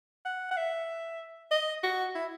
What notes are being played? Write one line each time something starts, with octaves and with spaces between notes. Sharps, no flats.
F#5
F#5
E5
D#5
F#4
E4